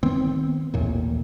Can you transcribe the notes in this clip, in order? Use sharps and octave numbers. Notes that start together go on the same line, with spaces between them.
D#3 B3 C4
A1 D#2 A#2